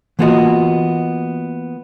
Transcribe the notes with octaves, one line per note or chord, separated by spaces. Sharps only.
E3 A#3 B3 F4 F#4 D#5